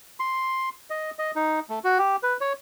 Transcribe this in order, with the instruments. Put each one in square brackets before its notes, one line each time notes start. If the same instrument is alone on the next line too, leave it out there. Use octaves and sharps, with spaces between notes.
[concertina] C6
D#5
D#5
D#4
A3
F#4
G4
B4
C#5